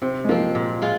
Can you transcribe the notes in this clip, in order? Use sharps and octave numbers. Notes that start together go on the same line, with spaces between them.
C3 C4
G#3
F3 A#3 C4
A#2
G#3 F4